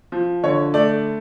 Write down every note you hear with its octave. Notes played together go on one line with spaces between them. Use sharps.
F3
D3 C#5
A3 D5